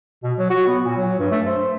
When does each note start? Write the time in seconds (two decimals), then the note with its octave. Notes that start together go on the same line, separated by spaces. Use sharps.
0.23 B2
0.38 F#3
0.50 F#4
0.67 B3
0.85 A#2
0.97 F#3
1.19 G2
1.31 A3
1.46 C5